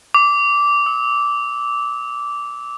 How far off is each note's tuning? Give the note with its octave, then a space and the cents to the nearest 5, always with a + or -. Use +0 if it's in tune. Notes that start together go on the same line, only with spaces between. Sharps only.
D6 -15
E6 -40